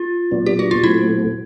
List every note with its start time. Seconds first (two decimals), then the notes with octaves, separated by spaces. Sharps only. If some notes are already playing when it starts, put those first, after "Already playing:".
Already playing: F4
0.31 A#2 F#3 B3 D4
0.46 G4
0.59 F#4
0.71 F4
0.83 A#2 F#3 A3 C4 E4